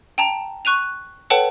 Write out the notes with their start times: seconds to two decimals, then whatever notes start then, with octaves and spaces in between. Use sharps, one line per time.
0.18 G5 A5 A#5
0.65 C#6 F#6 D#7 F7
1.30 A4 B4 C#5 F#5 G5 A5